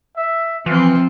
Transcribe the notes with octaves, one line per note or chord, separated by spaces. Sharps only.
E5
E3 F3 C4 F4